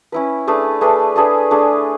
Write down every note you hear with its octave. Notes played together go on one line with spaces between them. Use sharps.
C#4 E4 B4
A3 D4 G#4 B4
A3 D4 G#4 B4
A3 D4 G#4 B4
A3 D4 G#4 B4